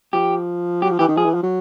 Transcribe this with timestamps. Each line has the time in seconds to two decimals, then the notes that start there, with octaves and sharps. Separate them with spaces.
0.13 F3 G4
0.82 F#3 G4
0.91 F3
0.99 E3 G4
1.08 D#3
1.17 F3 G#4
1.25 E3
1.34 F3
1.43 F#3